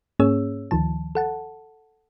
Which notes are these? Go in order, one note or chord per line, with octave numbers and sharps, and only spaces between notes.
G#2 A#3 C#4 G#4 C#5 E6
D2 D#3 F3 A5
A4 F#5 A5